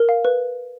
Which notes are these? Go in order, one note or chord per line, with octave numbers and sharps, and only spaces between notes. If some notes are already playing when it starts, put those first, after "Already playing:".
Already playing: A#4
F5
B4